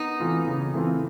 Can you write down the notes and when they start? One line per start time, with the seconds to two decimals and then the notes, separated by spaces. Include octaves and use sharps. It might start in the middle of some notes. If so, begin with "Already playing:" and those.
Already playing: B3 D#4
0.20 E3 A3 C4 F4
0.47 C#3
0.74 E3 A3 C4 F4